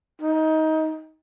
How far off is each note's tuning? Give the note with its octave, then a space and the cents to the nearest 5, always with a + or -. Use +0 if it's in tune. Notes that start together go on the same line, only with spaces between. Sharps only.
D#4 +20